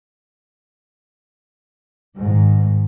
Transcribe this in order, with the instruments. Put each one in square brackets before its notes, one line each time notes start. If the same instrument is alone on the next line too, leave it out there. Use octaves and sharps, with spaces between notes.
[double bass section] G#2 D#3